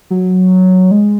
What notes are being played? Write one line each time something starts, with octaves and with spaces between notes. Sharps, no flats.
F#3
G#3